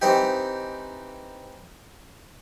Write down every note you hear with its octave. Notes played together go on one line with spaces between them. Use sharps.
E3 C4 D#4 G4